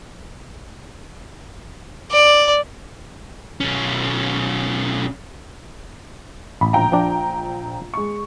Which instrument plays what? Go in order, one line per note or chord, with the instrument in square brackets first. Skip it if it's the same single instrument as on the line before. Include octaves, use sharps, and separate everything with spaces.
[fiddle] D5
[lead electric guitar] B1 C#4
[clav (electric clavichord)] A1 [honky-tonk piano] B5
[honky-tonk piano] A#1 G5 A#5
[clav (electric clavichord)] F3 D4
[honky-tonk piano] G#3 C#6